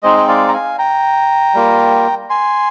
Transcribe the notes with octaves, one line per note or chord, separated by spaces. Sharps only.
G#3 C4 D#4 C5 D#5
G5
D5 F5
A#5
F5 G#5
G5 A#5
G3 A#3 F4
G#5 C6